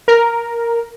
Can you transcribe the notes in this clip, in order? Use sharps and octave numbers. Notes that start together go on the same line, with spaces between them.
A#4